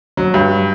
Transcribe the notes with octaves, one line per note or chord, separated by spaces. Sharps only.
F#3
G2